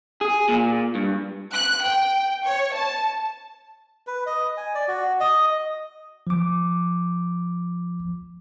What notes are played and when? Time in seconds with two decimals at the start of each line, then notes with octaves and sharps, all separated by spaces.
0.21 G#4
0.48 A#2
0.95 G2
1.52 F#6
1.84 G5
2.45 C#5
2.75 A5
4.07 B4
4.26 D#5
4.57 G#5
4.75 D5
4.88 F#4
5.20 D#5
6.27 F3 D6